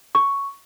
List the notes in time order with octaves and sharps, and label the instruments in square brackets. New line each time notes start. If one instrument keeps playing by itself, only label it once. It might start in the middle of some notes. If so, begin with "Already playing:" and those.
[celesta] C#6